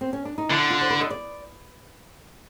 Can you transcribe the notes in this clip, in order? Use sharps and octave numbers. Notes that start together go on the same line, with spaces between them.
C4
C#4
D4
D#4
D3 E4
F4
C5
B4
D#5
D5